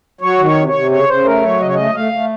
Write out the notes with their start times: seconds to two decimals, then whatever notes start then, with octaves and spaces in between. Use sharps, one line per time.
0.21 F#3 C#5
0.39 D#3
0.45 C#5
0.56 C3
0.68 C#5
0.73 C3
0.91 C#3 C#5
1.08 C#3 C5
1.25 A3 A#4
1.43 F#3 C#5
1.60 C#3 D#5
1.67 C#5
1.74 A3 D#5
1.95 A3 F5
2.13 A3